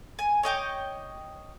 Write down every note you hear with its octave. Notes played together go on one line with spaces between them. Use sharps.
G#5
C#5 D#5 G5 D6